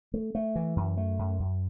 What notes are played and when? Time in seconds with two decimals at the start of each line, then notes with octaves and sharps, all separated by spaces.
0.14 A3
0.35 A3
0.56 E3
0.76 F#2
0.97 A3
1.19 F#2
1.40 F#2